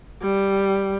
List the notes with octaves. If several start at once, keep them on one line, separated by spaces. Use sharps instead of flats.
G3